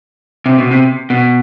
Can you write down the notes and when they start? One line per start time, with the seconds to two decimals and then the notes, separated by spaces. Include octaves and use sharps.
0.46 C3
0.58 B2
0.71 C3
1.10 B2